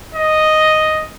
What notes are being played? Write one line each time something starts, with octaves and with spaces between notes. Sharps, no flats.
D#5